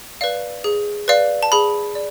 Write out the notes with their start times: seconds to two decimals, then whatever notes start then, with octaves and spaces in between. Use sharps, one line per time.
0.21 B4 D5 F5
0.64 G#4
1.08 B4 D5 F5
1.43 A5
1.52 G#4 B5
1.95 D5